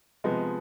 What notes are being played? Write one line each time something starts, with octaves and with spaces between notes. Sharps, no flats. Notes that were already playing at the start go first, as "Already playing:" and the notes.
C3 F3 G#3 B3 D#5